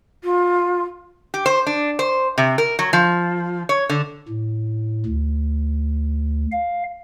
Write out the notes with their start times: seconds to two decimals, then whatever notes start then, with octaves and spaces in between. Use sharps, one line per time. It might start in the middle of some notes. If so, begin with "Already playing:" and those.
0.24 F4
1.34 G4
1.46 C5
1.67 D4
1.99 C5
2.38 C3
2.58 A#4
2.79 F#3
2.93 F3
3.69 C#5
3.89 D3
4.28 A2
5.06 D2
6.52 F5